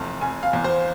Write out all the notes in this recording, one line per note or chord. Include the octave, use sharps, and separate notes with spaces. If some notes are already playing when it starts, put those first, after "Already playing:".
Already playing: F1 E2 A5
F1 G#5
F5
E2
C5